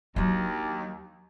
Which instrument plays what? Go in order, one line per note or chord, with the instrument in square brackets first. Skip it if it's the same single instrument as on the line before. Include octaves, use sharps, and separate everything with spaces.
[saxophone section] D#2 [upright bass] F#3 D4